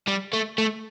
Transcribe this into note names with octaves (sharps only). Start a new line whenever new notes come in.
G3
A3
A3